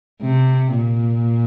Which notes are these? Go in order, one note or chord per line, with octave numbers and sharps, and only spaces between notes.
C3
A#2